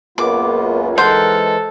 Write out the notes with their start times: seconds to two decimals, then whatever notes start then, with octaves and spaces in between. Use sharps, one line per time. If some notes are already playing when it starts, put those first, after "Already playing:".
0.18 C#2 F#2 A#3 B3 F4 D6
0.98 E3 G#3 D#4 A4 A#4 C5 F#5